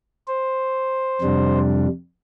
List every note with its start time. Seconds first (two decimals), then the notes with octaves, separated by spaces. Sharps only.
0.27 C5
1.21 F2 C3 G3 D4